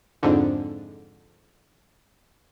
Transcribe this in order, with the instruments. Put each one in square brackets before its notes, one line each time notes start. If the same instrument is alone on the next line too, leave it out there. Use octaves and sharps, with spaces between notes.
[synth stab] F2 G#2 D3